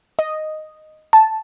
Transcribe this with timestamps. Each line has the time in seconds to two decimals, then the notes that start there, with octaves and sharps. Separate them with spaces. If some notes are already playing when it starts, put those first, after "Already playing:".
0.19 D#5
1.13 A5